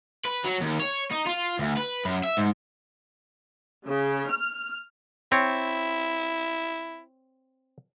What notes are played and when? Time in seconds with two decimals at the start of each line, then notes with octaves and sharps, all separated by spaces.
0.25 B4
0.44 F#3
0.61 D#2
0.80 C#5
1.12 D#4
1.27 F4
1.59 D2
1.77 B4
2.05 F#2
2.24 E5
2.37 G#2
3.87 C#3
4.27 F6
5.32 C4 E4 C#5